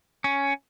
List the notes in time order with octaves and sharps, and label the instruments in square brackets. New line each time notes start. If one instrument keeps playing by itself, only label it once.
[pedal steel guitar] C#4